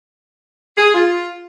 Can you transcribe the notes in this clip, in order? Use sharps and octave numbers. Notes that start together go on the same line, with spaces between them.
G#4
F4